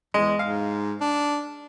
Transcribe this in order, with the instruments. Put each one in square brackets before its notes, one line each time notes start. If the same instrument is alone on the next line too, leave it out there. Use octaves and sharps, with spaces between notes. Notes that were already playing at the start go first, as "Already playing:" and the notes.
[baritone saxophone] E2 [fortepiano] G#3
[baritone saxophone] G#2 [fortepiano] F5
[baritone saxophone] D4